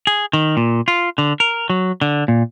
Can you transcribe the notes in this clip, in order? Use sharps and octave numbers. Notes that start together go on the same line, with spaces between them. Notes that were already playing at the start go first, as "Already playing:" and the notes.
G#4
D#3
A#2
F4
D3
A#4
F#3
D3
A#2